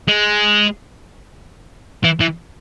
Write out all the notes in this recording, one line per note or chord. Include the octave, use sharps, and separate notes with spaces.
G#3
E3
E3